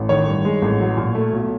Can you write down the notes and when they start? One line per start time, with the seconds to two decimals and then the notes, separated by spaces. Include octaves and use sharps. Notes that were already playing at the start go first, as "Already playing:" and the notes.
Already playing: A1
0.09 D#3 C#5
0.27 G2
0.45 G#3
0.62 A1
0.80 F#3
0.97 A#2
1.15 A3
1.33 B1